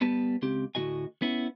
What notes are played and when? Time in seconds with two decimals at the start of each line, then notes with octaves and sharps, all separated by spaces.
0.01 G3 B3 B4 A5
0.42 C#2 C4 G4
0.75 D2 A2 C#3 F#4 D#5 G#5
1.22 B3 C#4 E4